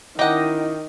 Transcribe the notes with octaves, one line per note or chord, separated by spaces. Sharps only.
D#3 C#4 D#4 E4 D#5 F#5 G5 D6